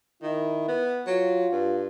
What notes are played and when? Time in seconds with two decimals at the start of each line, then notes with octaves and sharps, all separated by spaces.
0.23 D#3 E4
0.68 B3
1.07 F#3 F4
1.52 G2